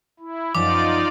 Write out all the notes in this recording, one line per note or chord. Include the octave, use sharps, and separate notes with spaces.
E4
F#2 F3 D#4 F4 D5 D6